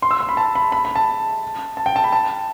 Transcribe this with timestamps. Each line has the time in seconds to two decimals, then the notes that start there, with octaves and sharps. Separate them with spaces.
0.02 C6
0.11 E6
0.21 C6
0.29 B5
0.37 A5
0.55 B5
0.72 B5
0.85 B5
0.96 A5
1.77 A5
1.86 G5
1.96 A5
2.04 B5
2.12 A5